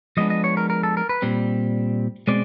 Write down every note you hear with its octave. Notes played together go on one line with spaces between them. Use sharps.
F3 G#3 B3 D4 D#5
D#5
C#5
A#4
A#4
A4
A#4
B4
A#2 G3 C4
B2 G#3 C4 D5